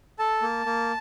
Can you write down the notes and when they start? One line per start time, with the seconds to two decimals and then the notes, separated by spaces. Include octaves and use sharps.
0.19 A4 A5
0.42 A#3
0.66 A#3